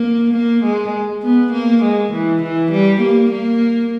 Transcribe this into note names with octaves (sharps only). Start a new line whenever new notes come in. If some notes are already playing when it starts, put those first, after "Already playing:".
Already playing: A#3
A#3
G#3
B3
A#3
G#3
E3
E3
G3
A#3
A#3